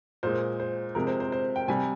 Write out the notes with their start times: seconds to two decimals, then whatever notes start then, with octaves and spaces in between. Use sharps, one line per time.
0.23 A#2 G#3 C5
0.60 C5
0.95 C3 F3 G#3 A#4
1.07 C5
1.20 C5
1.32 C5
1.56 G5
1.68 C3 G3 G#5